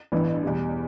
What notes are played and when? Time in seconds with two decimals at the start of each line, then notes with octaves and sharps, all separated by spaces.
0.12 A1 G2 E3 B3
0.43 E2 B2 G3